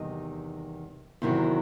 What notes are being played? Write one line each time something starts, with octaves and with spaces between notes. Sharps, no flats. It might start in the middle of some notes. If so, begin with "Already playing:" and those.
Already playing: E2 C3 D#3 G3 D#5
E2 C3 D#3 F#3